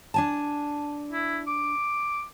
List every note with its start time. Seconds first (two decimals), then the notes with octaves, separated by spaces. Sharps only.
0.14 D4 G#5 A5
1.13 E4
1.47 D6